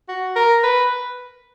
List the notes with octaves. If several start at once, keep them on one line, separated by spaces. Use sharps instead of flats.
F#4
A#4
B4